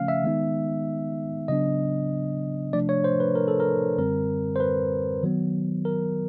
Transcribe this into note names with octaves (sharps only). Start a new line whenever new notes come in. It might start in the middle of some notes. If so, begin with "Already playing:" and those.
Already playing: C#3 F3 A3 C#4 F5
E5
D#3 G#3 B3 D#4
C#3 F#3 B3 D4 D#5
C3 F3 A3 D4 D5
C#5
C5
B4
A#4
A4
A#4
F#2 D3 G3 C4 A#4
C5
B4
D#3 F#3 B3
A#4